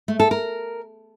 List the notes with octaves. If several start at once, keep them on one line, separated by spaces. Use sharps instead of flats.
A3
A4
A#4